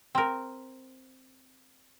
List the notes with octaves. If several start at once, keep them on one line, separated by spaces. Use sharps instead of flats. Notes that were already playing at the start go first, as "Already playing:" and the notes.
C4 A#4